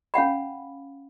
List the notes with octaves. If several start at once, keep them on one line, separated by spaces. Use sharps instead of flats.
C#4 F5 F#5 B5